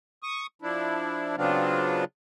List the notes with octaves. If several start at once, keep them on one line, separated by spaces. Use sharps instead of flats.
C#6 D#6
F3 D4 E4
C#3 F#3 B3 C4 D4 F4